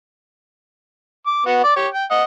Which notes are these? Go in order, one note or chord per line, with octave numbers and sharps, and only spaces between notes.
D6
B3 F#4
D5 D6
G4 C#5
G5
D#5 F#5